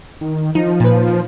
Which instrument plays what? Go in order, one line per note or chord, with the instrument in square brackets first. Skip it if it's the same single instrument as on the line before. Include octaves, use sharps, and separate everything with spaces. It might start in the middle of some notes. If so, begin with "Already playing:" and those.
[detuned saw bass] D#3
[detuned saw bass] F3 [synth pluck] D#4
[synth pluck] A#2 B4